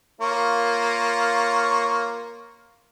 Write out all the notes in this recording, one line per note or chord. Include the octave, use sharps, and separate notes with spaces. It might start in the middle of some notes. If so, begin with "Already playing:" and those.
A#3 F4 C#5